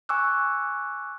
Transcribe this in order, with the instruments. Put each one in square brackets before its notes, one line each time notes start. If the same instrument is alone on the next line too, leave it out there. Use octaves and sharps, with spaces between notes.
[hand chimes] G#5 C#6 D6 E6 F#6